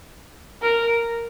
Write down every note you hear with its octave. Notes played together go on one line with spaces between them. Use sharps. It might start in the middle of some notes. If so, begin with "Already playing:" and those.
A#4